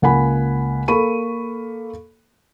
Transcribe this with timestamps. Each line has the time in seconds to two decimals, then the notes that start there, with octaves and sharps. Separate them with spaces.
0.02 C#2 A#3 F#5 G#5 B5
0.88 A#3 A4 B5 C#6 D#7